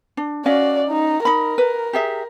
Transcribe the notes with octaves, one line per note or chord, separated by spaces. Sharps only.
D4
C#4 F#4 D5 D#5 F5
D#4
D#4 A#4 B5
B4
G4 G#4 E5